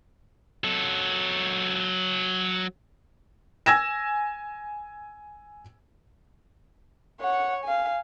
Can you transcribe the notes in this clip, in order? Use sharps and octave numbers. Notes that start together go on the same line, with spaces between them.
F#3 A4
G#5 E6 G#6 A#6 E7
C#5 F#5
F5 G#5